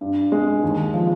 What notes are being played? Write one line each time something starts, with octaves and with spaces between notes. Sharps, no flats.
G2
G#3
D#2
F3